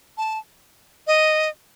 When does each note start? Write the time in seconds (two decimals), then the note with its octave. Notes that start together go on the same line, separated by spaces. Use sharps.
0.18 A5
1.07 D#5